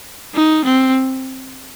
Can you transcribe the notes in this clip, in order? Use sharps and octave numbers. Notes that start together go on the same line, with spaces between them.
D#4
C4